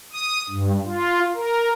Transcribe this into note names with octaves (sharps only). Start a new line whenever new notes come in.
D#6
G2
F4
A#4